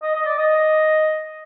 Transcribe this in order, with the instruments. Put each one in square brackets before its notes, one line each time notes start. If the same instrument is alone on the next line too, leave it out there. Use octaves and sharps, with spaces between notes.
[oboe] D#5
D#5
D5
D#5